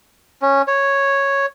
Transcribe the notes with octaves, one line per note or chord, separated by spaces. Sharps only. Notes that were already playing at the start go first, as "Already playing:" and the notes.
C#4
C#5